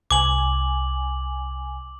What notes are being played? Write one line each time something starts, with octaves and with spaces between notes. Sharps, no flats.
C2 G#5 D6 F#7